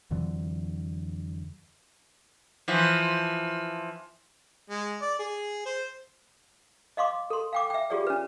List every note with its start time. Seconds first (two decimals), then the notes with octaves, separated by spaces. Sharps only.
0.11 F2 D3 E3 F#3
2.68 E3 F3
4.70 G#3
5.02 D5
5.19 G#4
5.66 C5
6.97 D#5 F5 C6 D6
7.30 A4 C6
7.53 F5 G5 D6
7.70 E5 G5
7.90 F4 G4 G#4 C#5 D5 F#5
8.07 C#4 B4